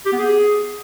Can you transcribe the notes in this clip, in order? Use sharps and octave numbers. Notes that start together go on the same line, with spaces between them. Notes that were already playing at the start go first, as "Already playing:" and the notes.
G4
B3
G#4